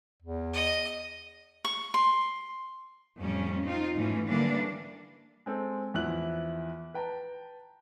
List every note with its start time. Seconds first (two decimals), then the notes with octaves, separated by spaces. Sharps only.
0.22 E2
0.53 D#5
1.65 C#6
1.94 C6
3.18 F2 A2 G3 C#4
3.63 C4 D#4 F4
3.95 G#2 E3 A3 C#4
4.28 D3 E3 G3 A#3 C#4 D4
5.46 G#3 C4 A4
5.94 E2 F3 E4 F#6 F#7
6.94 B4 G5 A5 A#5